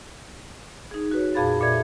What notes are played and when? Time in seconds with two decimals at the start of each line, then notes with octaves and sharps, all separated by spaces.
0.91 D#4 G#4
1.11 F#4 B4 C#5
1.34 F2 A#2 G#4 F5 B5 A6
1.61 A#2 A4 D5 E5 G#6